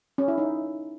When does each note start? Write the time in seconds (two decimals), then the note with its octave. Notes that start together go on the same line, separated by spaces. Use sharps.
0.18 C#4
0.28 E4
0.38 D#4